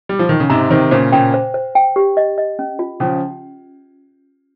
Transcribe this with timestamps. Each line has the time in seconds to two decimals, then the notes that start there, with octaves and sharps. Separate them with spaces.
0.09 G3
0.19 F3
0.29 D#3
0.40 C#3
0.50 G#2 C3 A#5
0.71 C3 D#3 C5
0.91 A#2 C#3 C5
1.12 A#2 C#3 G5
1.34 C5
1.54 C5
1.75 G5
1.96 G4
2.17 D#5
2.38 D#5
2.59 C#4
2.79 F4
3.00 C#3 F3 C#4